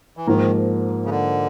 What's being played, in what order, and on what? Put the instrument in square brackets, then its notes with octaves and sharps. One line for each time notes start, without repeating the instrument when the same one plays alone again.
[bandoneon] E3
[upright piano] G#2 F3 A#3 [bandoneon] D#3
[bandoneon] C#3
D3